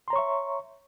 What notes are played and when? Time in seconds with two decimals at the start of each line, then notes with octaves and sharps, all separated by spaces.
0.08 C6
0.10 A#5
0.13 C#5
0.16 C#6
0.18 E5